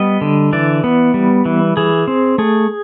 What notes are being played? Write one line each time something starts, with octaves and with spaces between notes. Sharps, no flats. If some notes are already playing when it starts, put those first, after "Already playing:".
Already playing: G3 B3 D#5
D3
E3 D5
B3
G3
E3
E3 G#4
C4
A3 G#4